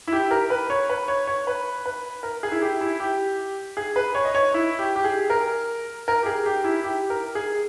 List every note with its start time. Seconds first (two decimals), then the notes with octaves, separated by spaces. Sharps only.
0.08 E4
0.13 G4
0.31 A#4
0.50 B4
0.70 C#5
0.90 B4
1.08 C#5
1.27 C#5
1.47 B4
1.86 B4
2.23 A#4
2.43 G#4
2.52 E4
2.62 G4
2.81 E4
3.00 G4
3.77 G#4
3.96 B4
4.15 C#5
4.25 D#5
4.35 C#5
4.54 E4
4.79 G4
4.96 G4
5.04 G#4
5.30 A#4
6.08 A#4
6.23 G4
6.26 G#4
6.46 G4
6.64 E4
6.84 G4
7.10 A#4
7.35 G#4